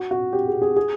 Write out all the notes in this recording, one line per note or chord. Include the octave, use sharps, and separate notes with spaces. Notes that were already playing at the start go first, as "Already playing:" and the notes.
Already playing: F#4
F#4
G4
G#4
G#4
G#4